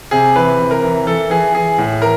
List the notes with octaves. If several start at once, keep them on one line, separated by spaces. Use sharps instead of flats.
C3 G#4
E3 B4
C3
A#4
E3
E3 A4
E3 G#4
E3 G#4
A2
E3 A#4